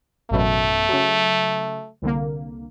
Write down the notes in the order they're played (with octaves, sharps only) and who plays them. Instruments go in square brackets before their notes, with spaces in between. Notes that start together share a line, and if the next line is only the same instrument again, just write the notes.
[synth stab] A1 F#2 B2 [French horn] A3
[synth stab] C#3 F#3
C2 D3 A#3